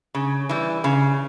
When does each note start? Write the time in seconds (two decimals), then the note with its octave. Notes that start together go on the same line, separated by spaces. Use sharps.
0.15 C#3
0.49 E3 G3
0.84 C#3